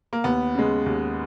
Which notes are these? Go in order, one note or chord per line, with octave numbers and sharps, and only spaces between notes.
A#3
D#2 B3
C#3 G#3
D#2